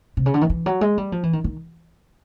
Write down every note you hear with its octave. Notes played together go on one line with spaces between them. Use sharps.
C3
C#3
D3
D#3
E3
F#3
G#3
G3
F3
E3
D#3
D#3